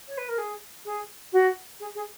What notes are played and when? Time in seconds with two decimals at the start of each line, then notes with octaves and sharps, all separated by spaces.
0.08 C#5
0.18 B4
0.29 A#4
0.38 G#4
0.85 G#4
1.33 F#4
1.80 G#4
1.95 G#4